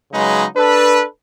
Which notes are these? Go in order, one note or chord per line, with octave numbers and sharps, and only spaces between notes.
C#3 F#3 G#3 D#4 B4
D4 A4 B4